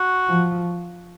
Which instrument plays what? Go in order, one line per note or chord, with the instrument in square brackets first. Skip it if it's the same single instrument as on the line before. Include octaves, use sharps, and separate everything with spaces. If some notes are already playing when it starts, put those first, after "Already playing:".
Already playing: [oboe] F#4
[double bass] F3